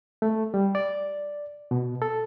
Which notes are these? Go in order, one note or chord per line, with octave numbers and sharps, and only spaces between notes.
A3
G3
D5
B2
A4